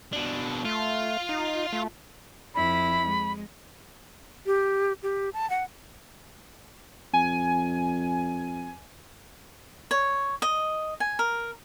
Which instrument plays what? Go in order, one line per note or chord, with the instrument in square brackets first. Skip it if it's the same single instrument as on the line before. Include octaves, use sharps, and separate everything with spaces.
[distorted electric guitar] B2 D4
[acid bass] A3 [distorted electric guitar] F4
[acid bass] D#4
A3
[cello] F2 E4 [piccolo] B5
[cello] G#3
[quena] G4
G4
A5
F#5
[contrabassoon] F2 [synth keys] G#5
[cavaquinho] C#5
D#5
G#5
A#4